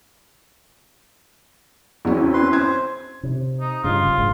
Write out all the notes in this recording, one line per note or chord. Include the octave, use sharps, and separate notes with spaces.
E2 C4 C#4 E4 F#4
B4 C6
C5 G#6
C3
D#4
G2 C#3 F4
F#1
A#1 G#2